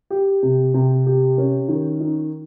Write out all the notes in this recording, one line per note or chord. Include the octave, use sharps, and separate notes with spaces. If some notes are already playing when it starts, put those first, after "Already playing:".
G4
C3
C3
G4
C#4
D#3
D#4